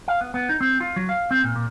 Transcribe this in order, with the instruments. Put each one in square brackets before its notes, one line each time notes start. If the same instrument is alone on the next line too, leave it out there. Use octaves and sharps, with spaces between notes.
[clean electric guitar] F5
B3
B3
D#4
C4
F4
F#3
F5
C4
A#2
A#2